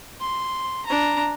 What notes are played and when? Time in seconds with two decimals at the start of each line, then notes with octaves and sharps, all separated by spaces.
0.20 C6
0.86 D4 A#5